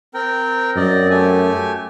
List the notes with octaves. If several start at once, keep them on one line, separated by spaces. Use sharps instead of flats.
C4 A#4 G5
F#2 C4 D5 D#5
A3 G4 G#5